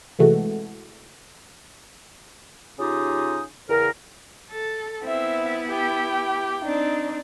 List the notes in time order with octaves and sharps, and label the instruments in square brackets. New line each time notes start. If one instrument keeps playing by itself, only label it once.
[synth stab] C3 E3 G#3 A3 F#4 A4
[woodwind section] C#3 D#4 F4 G4 D#6
E2 C#3 A#4
[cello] A4
[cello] B3 E4 [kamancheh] C4 E5
[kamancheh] G4 G5
[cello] C4 D4 [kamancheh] D#4